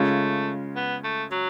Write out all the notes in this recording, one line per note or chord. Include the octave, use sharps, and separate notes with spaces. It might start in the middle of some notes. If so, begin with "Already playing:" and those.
Already playing: C#3 G#3 A3 C#4 F4
B3
A3
F#3